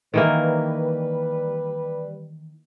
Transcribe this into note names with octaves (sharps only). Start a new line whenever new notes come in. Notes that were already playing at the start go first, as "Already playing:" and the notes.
D#3 E3 G3 A#3 B4